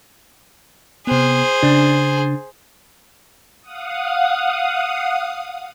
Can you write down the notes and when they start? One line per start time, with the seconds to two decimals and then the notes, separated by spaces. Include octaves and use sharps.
1.07 C3 B3 G#4 C5
1.63 C#3 D4
3.62 F5 F#5 D#6